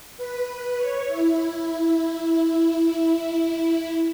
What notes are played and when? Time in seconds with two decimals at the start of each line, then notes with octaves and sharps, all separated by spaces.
0.17 B4
0.47 B4
0.76 C#5
1.07 E4